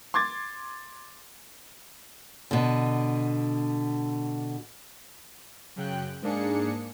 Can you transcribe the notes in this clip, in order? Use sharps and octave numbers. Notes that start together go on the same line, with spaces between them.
C6 D6 G#6 A6
B2 D3
F#2 C#3 G5 F#6
G#2 A#3 D4 G#4 C#7